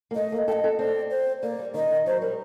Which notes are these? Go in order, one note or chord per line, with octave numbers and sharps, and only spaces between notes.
A#3
A3 D#5
A#3
A4 D#5 G5
A4
C4 D5
C5
A#3 D5
G3
D#3 D#5
D#3
F#3 C5
G3 A#4